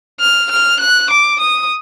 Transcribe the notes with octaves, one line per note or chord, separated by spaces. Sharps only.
F6
F6
F#6
D6
D#6